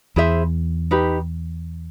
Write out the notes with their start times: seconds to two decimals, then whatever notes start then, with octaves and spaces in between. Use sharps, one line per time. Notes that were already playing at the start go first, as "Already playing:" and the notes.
0.16 E2 E4 G#4 C5 E5
0.91 D#4 G4 B4